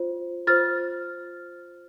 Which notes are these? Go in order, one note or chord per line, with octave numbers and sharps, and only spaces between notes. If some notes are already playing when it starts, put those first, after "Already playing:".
Already playing: F4 C5
F4 C5 F6 A6